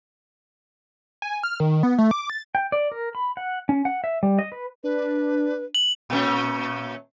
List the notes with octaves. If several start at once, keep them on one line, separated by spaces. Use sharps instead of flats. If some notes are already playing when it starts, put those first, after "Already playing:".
G#5
F6
D#3
B3
A3
D6
A6
G5
D5
A#4
B5
F#5
C#4
F#5
E5
G3
D#5
B4
D4 B4
F#7
A#2 A3 C#4